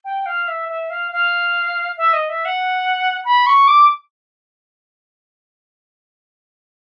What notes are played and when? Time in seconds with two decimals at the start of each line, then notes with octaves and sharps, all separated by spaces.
0.05 G5
0.26 F5
0.48 E5
0.69 E5
0.90 F5
1.12 F5
1.97 E5
2.13 D#5
2.29 E5
2.45 F#5
3.25 B5
3.47 C#6
3.68 D6